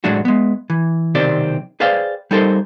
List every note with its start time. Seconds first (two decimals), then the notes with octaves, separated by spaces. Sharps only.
0.04 A2 F#3 G#3 D4 F#4
0.25 G#3 B3
0.70 E3
1.15 B1 C3 D#3 C4 G4 D5
1.80 G#4 B4 C5 D5 F5 G5
2.31 G3 D#4 A4 A#4 C5